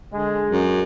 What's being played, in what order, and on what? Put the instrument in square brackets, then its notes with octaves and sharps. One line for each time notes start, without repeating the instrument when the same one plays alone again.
[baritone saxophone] D3 [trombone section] G#3
[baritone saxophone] F#2